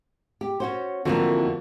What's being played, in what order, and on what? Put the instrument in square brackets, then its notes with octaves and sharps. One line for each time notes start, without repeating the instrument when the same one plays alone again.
[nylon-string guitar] G4
C#4 F#4 C5
[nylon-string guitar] F2 E3 A#3 [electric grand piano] D3 F3 F#4